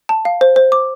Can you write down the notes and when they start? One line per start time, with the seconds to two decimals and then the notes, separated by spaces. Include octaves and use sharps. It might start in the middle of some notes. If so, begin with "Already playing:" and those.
0.09 A5
0.25 F5
0.41 C5
0.56 C5
0.72 D6